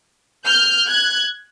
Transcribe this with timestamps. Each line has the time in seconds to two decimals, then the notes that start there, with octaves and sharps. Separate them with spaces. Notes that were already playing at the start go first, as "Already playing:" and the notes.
0.46 F6 G6
0.88 F#6 G#6